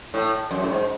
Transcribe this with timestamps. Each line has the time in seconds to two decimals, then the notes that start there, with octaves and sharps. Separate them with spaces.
0.14 A2
0.51 F#2
0.63 A2
0.69 G#2